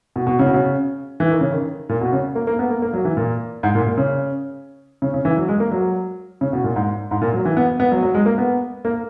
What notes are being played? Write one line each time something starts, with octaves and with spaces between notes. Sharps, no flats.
B2
B2
C#3
B2
C#3
E3
D#3
C#3
D#3
A#2
B2
C#3
A#3
A#3
B3
A#3
A#3
F#3
E3
A#2
G#2
A#2
A#2
C#3
C#3
C#3
E3
F#3
G#3
A#3
F#3
C#3
B2
A#2
G#2
G#2
A#2
F#3
E3
B3
B3
F#3
F#3
G#3
A#3
B3
A#3